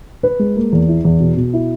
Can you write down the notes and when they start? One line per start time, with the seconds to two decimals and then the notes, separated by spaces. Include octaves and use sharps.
0.23 B4
0.39 G#3
0.56 A#3
0.72 E2
0.89 E4
1.05 E2
1.20 B2
1.37 B2
1.53 E4